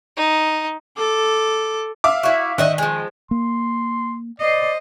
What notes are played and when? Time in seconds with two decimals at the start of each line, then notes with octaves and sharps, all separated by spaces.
0.17 D#4
0.97 A4 D6
2.04 E5 F5 D6
2.23 E4 F#4
2.58 D#3 D#5 E5 F#5
2.78 F3 G#3
3.31 A#3 C6
4.40 C5 D5 D#5